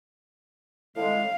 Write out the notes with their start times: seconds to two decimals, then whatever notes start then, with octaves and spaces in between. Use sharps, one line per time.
0.97 A2 G#3 F5